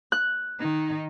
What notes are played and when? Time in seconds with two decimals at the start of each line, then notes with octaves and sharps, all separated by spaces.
0.12 F#6
0.59 D#3 D#4